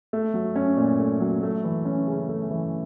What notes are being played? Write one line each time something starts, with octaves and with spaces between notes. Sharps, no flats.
A3
F#3
C#4
A#2
A3
F#3
A3
E3
C#4
C#3
A3
E3